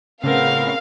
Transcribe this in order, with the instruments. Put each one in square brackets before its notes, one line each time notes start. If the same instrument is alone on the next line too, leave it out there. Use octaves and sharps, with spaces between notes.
[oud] A2 F3 B3 [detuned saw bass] C#3 [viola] C4 A#4 [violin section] F5